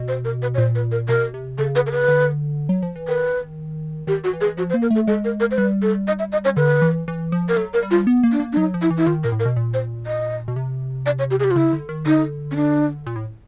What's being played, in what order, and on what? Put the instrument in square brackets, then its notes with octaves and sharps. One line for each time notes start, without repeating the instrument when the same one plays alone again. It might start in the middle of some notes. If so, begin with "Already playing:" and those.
Already playing: [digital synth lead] B2
[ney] C5
A#4
B4
C#5
[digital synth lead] A#2 [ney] C5
[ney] B4
A#4
[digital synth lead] B2 [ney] A#4
[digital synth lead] C3
[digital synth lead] C#3 [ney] A4
[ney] B4
A#4
B4
[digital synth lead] D3
F#3
F3
E3
[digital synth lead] D#3 [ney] B4
[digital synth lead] D#3 [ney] G4
[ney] F#4
[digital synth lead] E3
[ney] G#4
[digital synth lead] E3
[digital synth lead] F3 [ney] F#4
[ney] C5
[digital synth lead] A#3
[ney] A#4
[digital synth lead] A3 [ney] A4
[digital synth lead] G#3 [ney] A4
[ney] A#4
A#4
C5
[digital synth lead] G3 [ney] B4
[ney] A4
D#5
E5
D#5
C#5
[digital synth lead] D3 [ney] B4
[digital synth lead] E3
E3
F3
[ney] A#4
[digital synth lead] F#3 [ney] A4
[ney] A#4
[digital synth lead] G3
[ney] F4
[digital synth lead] B3
A#3
[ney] D4
[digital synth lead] A#3
[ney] D4
[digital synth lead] F#3 [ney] D#4
[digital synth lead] F3
[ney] E4
[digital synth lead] E3
[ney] E4
[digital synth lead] D#3 [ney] F4
[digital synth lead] A#2 [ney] A#4
[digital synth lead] A2
[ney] A#4
[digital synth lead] B2
A#2
[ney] C5
D#5
[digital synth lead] B2
C3
[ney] D5
C#5
G4
G#4
G4
F4
[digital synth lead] C#3 [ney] E4
[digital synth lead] D3
D#3
[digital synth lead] D3 [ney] D#4
[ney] C#4
D4
[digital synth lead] A#2
A2